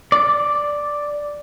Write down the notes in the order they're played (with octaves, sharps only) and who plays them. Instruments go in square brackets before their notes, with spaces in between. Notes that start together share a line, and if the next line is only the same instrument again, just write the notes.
[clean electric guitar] D5